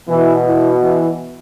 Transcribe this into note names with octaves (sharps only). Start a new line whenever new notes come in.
B2 E3
E3
E3